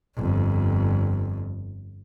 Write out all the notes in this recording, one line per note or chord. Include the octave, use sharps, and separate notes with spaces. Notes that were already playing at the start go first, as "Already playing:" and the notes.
G1 F2